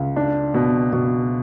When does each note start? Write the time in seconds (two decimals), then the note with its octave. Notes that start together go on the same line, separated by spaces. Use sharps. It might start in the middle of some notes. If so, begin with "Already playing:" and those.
Already playing: C#2
0.16 D4
0.54 B2
0.93 B2